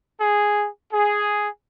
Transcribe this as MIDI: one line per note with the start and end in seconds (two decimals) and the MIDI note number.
0.20 0.68 68
0.93 1.49 68